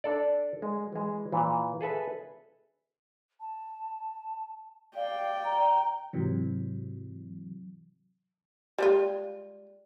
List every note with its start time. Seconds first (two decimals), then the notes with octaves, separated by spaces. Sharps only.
0.04 D4 A4 D5
0.62 G#3
0.93 E3 G#3
1.32 A#2 E3
1.81 G#4 A4 B4 E5
3.40 A5
4.96 D5 F5 G5
5.44 A#5
6.13 G#2 C3 E3 F#3
8.78 G3 G#3 F4